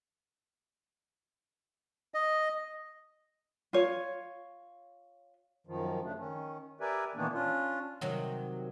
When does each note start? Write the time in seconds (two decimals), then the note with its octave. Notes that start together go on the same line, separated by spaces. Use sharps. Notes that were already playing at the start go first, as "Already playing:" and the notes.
2.14 D#5
3.73 F4 C#5
5.67 F#2 D#3 F3
6.04 C#3 A3 D4
6.18 D#3 C#4
6.81 G4 A#4 B4 D5 E5 G#5
7.15 A#2 D#3 E3 A#3 B3 D4
7.33 C#4 D4 F4
8.01 C3 D#3 F#3